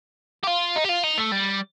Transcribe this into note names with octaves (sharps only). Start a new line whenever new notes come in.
G4
F4
D#4
G4
F4
D#4
A3
G3